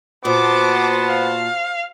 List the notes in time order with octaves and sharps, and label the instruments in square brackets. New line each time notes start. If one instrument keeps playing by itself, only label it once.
[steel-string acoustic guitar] A#2 [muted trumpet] B3 [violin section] F#4 C5 A5 [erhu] D6
[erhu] F5